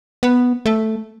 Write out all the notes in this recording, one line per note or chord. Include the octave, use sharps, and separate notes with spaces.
B3
A3